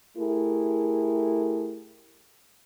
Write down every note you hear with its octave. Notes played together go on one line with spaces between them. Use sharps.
A3 E4 G4 G#4 A#4